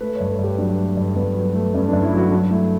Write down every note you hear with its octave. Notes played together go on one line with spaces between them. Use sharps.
A3 B4
G2 C#5
A4
G2
G4
F#3 D4
A3
G2
G2 B3
F#3
A3
G2 C#4
G2 D4
E4
F#3 E4 F#4
F#3 D4
A3 E4